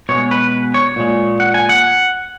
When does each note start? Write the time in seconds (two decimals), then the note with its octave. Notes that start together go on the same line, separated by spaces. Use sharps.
0.09 B2 G#3 C#5
0.31 B4
0.74 C#5
0.96 A#2 G#3
1.40 F#5
1.54 G#5
1.69 F#5